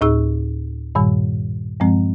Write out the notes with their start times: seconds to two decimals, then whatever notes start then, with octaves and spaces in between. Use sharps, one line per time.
0.01 D2 A2 D#4 G#4 E6
0.95 G2 A#2 D#3 G3
1.80 G2 F3 G#3 C4